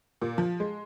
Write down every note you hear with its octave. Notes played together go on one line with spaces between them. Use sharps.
A#2
F3
G#3